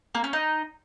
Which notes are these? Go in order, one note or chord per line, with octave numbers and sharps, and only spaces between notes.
A#3
C#4
D#4